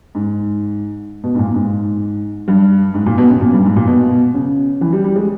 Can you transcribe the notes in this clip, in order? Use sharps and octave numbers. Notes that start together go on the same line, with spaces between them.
G#2
B2
G#2
A#2
G#2
G2
G#2
A#2
B2
C#3
A#2
G2
G#2
A#2
B2
C#3
E3
G3
G3
G#3